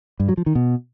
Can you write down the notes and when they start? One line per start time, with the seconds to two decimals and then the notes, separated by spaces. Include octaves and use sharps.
0.20 G2
0.29 F#3
0.37 F3
0.46 D#3
0.55 B2